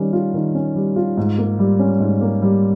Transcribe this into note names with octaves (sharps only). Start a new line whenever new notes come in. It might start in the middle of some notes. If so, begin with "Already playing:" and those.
Already playing: D#3 G3 C#4
F4
D#3
C#4
G3
F4
G#2
A#3
G3
C#4
G#2
A#3
G3